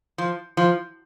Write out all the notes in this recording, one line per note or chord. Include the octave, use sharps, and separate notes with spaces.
F3
F3